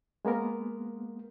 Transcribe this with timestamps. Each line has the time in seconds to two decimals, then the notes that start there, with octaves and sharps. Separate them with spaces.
0.25 G#3 A#3 B3 A#4